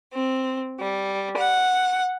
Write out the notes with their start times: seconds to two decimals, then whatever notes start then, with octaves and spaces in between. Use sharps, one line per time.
0.13 C4
0.80 G3
1.36 F#5